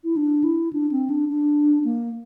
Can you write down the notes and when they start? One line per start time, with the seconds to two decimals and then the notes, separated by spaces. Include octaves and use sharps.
0.04 E4
0.16 D4
0.44 E4
0.73 D4
0.92 C4
1.10 D4
1.28 D4
1.84 A#3